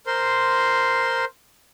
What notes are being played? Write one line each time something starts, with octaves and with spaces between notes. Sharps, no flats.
A#4 C5 C6